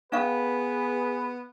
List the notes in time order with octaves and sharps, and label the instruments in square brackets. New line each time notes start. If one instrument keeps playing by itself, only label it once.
[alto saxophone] B3 [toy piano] C#4 F5 [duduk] G#4 [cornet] B4